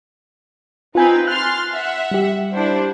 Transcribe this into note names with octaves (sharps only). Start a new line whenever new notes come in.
C4 D#4 F4 B4 G#5 G6
C6 F6 F#6 A6
E5 F#5
G3 G4
D4 E4 C5